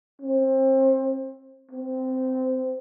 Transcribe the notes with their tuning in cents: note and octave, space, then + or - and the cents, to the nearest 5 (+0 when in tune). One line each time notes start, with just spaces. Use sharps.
C4 +25
C4 -15